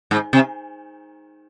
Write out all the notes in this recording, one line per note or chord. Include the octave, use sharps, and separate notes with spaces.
G#2
C3